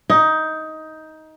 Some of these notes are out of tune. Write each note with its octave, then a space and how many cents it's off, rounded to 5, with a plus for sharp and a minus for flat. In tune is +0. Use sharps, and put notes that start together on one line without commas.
D#4 +15